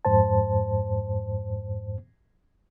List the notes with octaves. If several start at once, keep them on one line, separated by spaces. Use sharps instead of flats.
F2 G#2 C5 A5